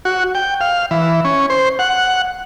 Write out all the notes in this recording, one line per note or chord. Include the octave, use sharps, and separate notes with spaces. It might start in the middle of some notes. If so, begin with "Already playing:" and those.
F#4
G5
F5
E3
C#4
C5
F#5